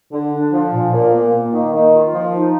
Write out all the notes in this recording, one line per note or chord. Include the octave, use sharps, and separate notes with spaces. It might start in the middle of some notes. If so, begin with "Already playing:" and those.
D3
D4
F3
A#2
A#2
A#3
A#3
D#3
D#3
F4
F3
D#4